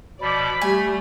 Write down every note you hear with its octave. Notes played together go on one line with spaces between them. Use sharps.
B2 F3 D5 B5 D6
G3 A3 G#5